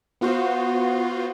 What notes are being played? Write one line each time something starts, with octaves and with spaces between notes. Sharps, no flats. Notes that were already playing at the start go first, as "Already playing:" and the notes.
B3 F4 F#4 C5